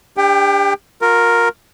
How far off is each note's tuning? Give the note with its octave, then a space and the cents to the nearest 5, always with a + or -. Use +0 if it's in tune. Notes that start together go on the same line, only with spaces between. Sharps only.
D4 +0 G4 +35 G5 +0
F4 +45 A#4 +0